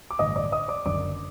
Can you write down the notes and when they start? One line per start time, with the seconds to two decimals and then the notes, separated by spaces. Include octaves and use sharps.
0.11 D6
0.19 A1 G2 D3 D#5 D#6
0.36 D5 D6
0.52 D#5 D#6
0.68 D5 D6
0.85 F#1 F#2 D3 D5 D6